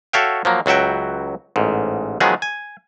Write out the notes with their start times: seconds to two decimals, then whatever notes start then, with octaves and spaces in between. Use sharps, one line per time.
0.13 F#4 A4 C#5 E5 F5 G5
0.45 F3 F#3 A#3
0.66 C#2 F#3 F#4 E5 G5
1.56 A1 G#2
2.20 D#3 F3 F#3 G#3 B3 G#4
2.42 G#5